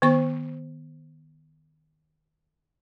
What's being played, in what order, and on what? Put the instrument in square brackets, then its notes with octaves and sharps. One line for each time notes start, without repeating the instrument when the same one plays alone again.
[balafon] D#3 B3 C5 C#6